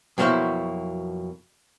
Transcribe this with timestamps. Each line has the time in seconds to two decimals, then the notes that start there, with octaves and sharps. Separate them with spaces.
0.18 F2 B2 F#3 A#3 E4 C5